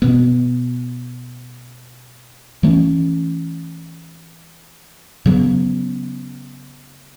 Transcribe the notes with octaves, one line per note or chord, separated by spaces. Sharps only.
B2 B3
E3 A3 C#4
C#3 F#3 B3